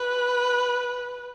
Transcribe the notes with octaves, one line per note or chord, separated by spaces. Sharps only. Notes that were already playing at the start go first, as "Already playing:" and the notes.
Already playing: B4